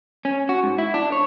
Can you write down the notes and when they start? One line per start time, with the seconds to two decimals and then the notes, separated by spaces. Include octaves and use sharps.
0.25 C#4
0.49 F#4
0.63 G#2
0.78 E4
0.94 D4
1.12 C#5